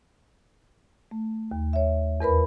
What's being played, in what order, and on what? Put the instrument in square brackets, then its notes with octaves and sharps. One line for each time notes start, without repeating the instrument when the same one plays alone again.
[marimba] A3
D#2
C#5 E5
E2 A#4 B4 B5